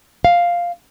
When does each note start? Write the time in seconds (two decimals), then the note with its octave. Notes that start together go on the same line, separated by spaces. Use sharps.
0.25 F5